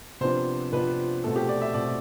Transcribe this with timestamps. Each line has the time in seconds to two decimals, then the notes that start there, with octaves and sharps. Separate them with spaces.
0.21 C3 F3 B3 D4 C5
0.73 C3 F3 B3 D4 B4
1.23 B2 A3 C4 A4
1.36 G4
1.49 D5
1.62 E5
1.74 B2 A3 C4 D5